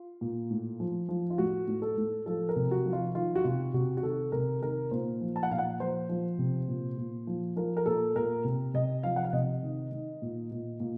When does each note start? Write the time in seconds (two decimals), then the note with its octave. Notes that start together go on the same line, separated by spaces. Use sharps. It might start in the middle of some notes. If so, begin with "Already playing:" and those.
Already playing: F4
0.21 A#2
0.50 A2
0.80 F3
1.09 F3
1.30 F4
1.38 A2 F#4
1.68 A2
1.82 A4
1.97 A2
2.26 F3 A4
2.49 A#4
2.56 C3
2.71 F#4
2.86 F3
2.93 F4
3.14 D#3 F4
3.36 F#4
3.44 C3 F4
3.74 C3 F#4
3.97 F#4
4.03 D#3 A4
4.32 C3 A#4
4.62 D#3 A#4
4.91 A#2 C5
5.21 F3
5.36 A5
5.43 F#5
5.51 A#2 F5
5.59 F#5
5.80 F3 C5
6.09 F3
6.39 C3
6.68 A#2
6.97 A#2
7.27 F3
7.56 F3 A#4
7.77 A#4
7.86 A#2 A4
8.15 A#2 A#4
8.45 C3
8.74 C3 D#5
9.03 F3 F5
9.16 F#5
9.24 F5
9.33 C3 D#5
9.63 D#3
9.92 D#3
10.22 A#2
10.51 A#2
10.80 A#2